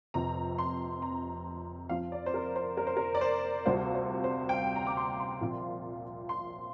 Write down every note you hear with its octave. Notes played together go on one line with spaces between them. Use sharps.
F1 F2 C3 A#5
C6
A#5
F2 F3 C4 F4 F5
D5
C5
A#4
C5
A#4
C5
A#4
D5
C5
D2 C3 G3 C4 F4 C5
C5
C5
G5
F5
A#5
D6
C6
C6
A#1 A#2 F3 C4 F4
C6